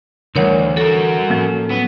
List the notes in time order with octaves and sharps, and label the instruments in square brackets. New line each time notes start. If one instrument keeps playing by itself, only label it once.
[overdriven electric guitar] D2 [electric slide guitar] D3 E3 G3 [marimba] A#4 C#5 F#5
[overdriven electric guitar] F#4 A#4 [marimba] A4
[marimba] A2 F3 [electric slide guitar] A#3 C#4 A4
[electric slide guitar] F#3 C#4 [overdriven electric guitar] B3